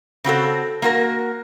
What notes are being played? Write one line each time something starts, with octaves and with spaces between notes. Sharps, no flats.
C#3 C4 F#4 A4
A#3 F#4 A#4